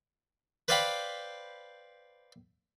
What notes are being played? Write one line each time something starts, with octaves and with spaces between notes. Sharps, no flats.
B4 C5 D5 F5 G5 B5